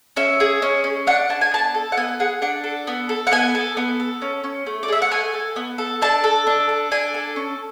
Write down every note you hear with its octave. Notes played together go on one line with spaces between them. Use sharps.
C#4 E5
G#4
C#4
C#4
D4 F#5
D4 A5
G#5
B3 A5
A4
F#5
B3 G#5
G#4 F#5
D4 F#5
A4
B3
A4
F#5
B3 G#5
A4
B3
A4
C#4
C#4
A3
D5
G#4 E5
F#5
A3 G#5
A4
B3
A4
D4 A5
A4
D4
A4
D4 G#5
A4
C#4